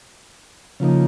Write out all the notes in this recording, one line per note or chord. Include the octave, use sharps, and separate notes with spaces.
C#3 F3 A#3 D#4